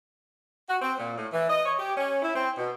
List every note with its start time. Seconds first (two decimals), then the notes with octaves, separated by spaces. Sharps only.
0.69 F#4
0.82 C4
0.98 A#2
1.18 A2
1.32 E3
1.49 D#5
1.66 C#5
1.79 G4
1.97 C#4
2.23 E4
2.35 C4
2.58 B2